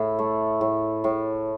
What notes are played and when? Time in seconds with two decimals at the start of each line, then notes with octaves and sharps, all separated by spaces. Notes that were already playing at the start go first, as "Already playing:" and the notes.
Already playing: A2 E4
0.19 A3
0.61 A2
1.04 A2